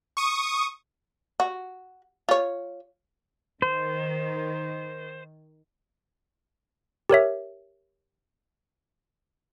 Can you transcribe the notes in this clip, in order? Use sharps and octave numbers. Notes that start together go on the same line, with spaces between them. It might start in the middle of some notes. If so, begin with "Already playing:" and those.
C#6 D#6
F#4
F4 C#5
D#3 C5
G4 A#4 C#5 E5